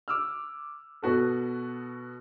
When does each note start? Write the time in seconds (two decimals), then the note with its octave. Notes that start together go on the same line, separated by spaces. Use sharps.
0.08 D6 E6 F6
1.02 B2 B3 F#4 A4